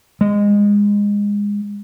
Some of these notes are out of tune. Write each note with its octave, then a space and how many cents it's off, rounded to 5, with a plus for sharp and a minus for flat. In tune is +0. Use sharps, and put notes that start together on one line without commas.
G#3 -20